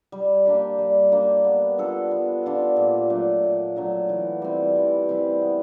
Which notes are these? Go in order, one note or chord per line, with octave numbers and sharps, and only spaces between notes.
G3
A#3 D4 G4
G3
A#3 D4 G4
B3
D4 F4 A4
B3
D4 F4 A4
A#2
F#3 A3 D4
A#2
F#3 A3 D4
E3
G3 C4 E4
E3
G3 C4 E4
B3